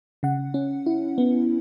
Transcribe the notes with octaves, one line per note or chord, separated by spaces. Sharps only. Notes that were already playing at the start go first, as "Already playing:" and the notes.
C#3 F#5
C#4
E4
B3